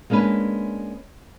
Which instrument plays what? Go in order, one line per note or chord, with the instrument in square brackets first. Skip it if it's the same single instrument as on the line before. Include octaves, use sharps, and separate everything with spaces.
[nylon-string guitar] G#3 A#3 C#4 D4 B4